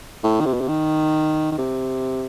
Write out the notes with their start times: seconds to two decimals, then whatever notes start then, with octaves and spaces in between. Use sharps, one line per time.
0.24 A2
0.40 D#3
0.46 C3
0.54 B2
0.61 C3
0.68 D#3
1.52 D#3
1.58 C3